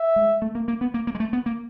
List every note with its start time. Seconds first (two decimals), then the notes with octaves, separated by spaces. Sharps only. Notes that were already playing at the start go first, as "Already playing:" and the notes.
Already playing: E5
0.16 G#3
0.42 A3
0.55 A#3
0.68 A#3
0.81 B3
0.94 A#3
1.07 A#3
1.15 G#3
1.20 A3
1.33 B3
1.46 A#3